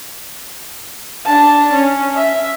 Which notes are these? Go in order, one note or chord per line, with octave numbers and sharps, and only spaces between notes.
D4 A5
C#4
E5